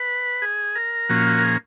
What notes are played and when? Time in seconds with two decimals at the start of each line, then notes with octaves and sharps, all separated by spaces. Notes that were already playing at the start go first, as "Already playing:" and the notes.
Already playing: B4
0.42 G#4
0.75 A#4
1.09 A#2 F3 A#3 C#4 F#4
1.27 F#4
1.38 A#4
1.43 G#4